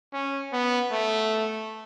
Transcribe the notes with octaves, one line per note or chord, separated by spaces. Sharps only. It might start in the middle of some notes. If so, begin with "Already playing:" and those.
C#4
B3
A3